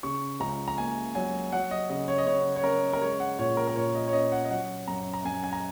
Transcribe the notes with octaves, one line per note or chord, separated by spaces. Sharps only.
C#3 C#6
C#2 A#5
A#5
A#3 G#5
F#3 G#5
F#3 F#5
D#5
C#3 D#5
C#5
D#5
C#3 C#5
C#5
C#4 A#4
A#4
G#3 C#5
F#5
A#2 C#5
A#4
A#4
A#2 C#5
D#5
C#5
C#4 D#5
F#5
D#5
F#3 F#5
F#2 A#5
A#5
F#2 G#5
G#5
A#5